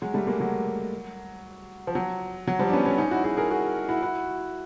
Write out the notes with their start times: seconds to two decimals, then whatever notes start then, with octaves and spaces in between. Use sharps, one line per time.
0.02 F#3 G#3
0.14 G3 A3
0.27 G#3 A#3
0.40 F#3
1.87 F3
1.95 F#3
2.47 F#3
2.59 F3 G3
2.69 D4
2.73 B3 C#4
2.85 B3 C#4
2.98 C#4 D#4
3.11 E4 F#4
3.24 F#4 G#4
3.37 G#4 A#4
3.50 F#4 G#4
3.89 E4 F#4
4.02 E4 F#4